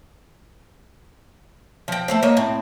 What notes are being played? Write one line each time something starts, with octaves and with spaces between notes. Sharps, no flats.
F3 G5
A3 E4 C5
A#3 C#5 D#5
A2 C4